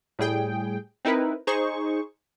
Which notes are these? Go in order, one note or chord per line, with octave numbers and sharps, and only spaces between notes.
A2 G3 G#4 G5
C4 D#4 E4 A#4 B4
D#4 G#4 C5 C#6